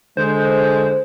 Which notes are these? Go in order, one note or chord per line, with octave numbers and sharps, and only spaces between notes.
D3 G#3 C5